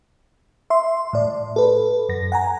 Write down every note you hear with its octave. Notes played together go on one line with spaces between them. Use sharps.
E5 C6
A2 D5
A4 B4
F#2 A#6
F#5 G#5 A#5